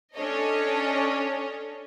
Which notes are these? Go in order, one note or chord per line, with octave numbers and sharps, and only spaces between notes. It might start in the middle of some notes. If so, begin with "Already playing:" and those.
C#4 D4 A4 C#5 D#5